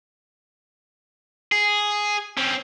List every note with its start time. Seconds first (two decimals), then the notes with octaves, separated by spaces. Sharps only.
1.52 G#4
2.37 C4 C#4